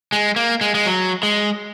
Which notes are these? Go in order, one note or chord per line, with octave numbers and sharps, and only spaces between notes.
G#3
A#3
G#3
G#3
F#3
G#3